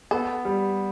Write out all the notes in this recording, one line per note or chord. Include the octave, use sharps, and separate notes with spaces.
B3 A4
G3